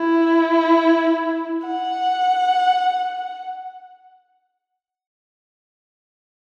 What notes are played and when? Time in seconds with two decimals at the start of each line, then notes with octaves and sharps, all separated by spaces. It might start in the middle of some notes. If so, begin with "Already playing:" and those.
Already playing: E4
1.67 F#5